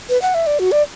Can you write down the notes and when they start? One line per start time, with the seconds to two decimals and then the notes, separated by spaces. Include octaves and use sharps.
0.09 B4
0.22 F#5
0.34 E5
0.47 D5
0.59 F#4
0.72 D5